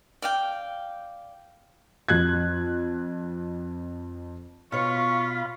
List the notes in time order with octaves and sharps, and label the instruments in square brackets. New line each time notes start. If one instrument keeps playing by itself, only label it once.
[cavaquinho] D5 F5 G5
[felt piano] F2 F#6 G#6
[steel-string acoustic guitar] B2 C#5 [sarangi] F4 [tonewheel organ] F5 B5 [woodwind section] C#6